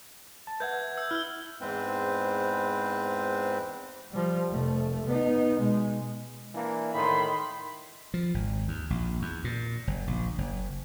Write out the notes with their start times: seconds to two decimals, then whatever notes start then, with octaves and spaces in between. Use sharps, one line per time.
0.47 A5
0.60 B4 E5 F#5 G6 G#6
0.97 E6 G6
1.11 E4 F6 G7
1.61 E2 G#2 G#3 C4 B4 C5
4.11 F3 G3
4.50 F1 A3
5.05 B3 D#4
5.58 B2 G#3
6.55 E3 A#3 D4
6.94 A2 D#3 B5 C6
8.14 F3
8.34 G#1
8.68 D#2
8.90 A#1
9.22 E2
9.44 A#2
9.87 F#1
10.07 A#1
10.38 F#1